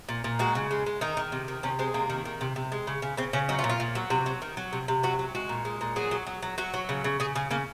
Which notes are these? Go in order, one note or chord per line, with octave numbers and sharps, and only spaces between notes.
A#2
A#2
G#3 F#4
C#3
G#3
G#3
D#3 D#4
D#3
C3
D#3
C3 C#4
G#3 C4
C3 A#3
D#3
D#3
C3
C3
G#3
C#3
C#3
C#3 C4
C#3 C#4
F#3 D#4
F4
A#2
F4
A#2
F#3
C3 F#4
F#3
D#3
F#3
C3
C3
F#3 F#4
F#3
G#3 F#4
A#2
G#3
A#2
F#3 G#4
F#3
F#3
F#3
F#3 F#4
F#3
C#3
C#3
C#3 G#4
C#3 G#4
C#3 A#3